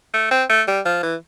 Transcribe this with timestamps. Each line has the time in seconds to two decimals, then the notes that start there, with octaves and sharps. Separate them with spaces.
0.14 A3
0.31 C4
0.50 A3
0.68 G3
0.85 F3
1.03 E3